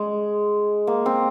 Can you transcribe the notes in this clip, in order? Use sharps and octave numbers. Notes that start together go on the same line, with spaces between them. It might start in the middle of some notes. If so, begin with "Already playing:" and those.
Already playing: G#3
A#3
C4